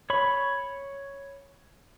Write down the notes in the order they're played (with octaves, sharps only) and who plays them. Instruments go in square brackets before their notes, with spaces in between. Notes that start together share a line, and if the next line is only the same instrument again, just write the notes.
[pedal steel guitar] C#5 B5 C#6